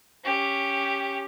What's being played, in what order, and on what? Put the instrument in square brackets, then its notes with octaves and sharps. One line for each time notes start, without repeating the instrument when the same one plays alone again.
[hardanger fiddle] C#4 G4